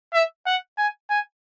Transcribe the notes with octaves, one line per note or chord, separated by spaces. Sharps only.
E5
F#5
G#5
G#5